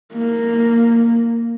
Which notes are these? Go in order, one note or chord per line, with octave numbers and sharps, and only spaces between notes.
A#3